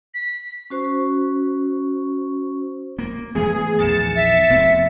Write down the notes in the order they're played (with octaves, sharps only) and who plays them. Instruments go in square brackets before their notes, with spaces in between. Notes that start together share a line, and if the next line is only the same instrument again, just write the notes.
[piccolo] B6
[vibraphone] C#4 F#4 C5 C#6
[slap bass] A#3
[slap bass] E3 A3 B3 [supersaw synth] G#4
[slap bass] A#1 E2 D#3 [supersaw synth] A6 C#7 E7
[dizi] E5
[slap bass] F1 B3 C4